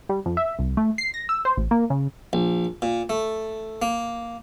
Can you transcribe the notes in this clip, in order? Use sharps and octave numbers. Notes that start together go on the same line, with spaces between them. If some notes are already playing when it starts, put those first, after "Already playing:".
G3
F2
E5
C2
A3
C7
A#6
E6
C5
A1
A#3
C#3
A#1
A#2
A3
A#3